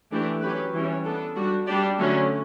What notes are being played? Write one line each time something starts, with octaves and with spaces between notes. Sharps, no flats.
E3 A3 D4 G4
F#3 C#4 G4 B4
E3 G3 C#4
B3 D4 A4
G3 D4 F#4
G3 D4 G4 D5
D3 F#3 A3 C#4